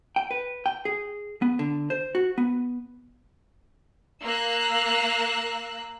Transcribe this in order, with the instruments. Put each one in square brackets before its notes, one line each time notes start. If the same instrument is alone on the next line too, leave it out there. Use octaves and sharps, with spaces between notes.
[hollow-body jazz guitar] G5
B4
G5
G#4
B3
D3
C5
F#4
B3
[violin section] A#3 E6 F#6